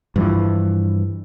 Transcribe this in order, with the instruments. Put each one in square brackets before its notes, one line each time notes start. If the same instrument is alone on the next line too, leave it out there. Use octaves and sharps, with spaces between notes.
[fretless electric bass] G2 E3 F3